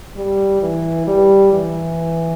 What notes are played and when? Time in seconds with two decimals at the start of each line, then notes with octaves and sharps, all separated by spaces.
0.17 G3
0.63 E3
1.07 G3
1.53 E3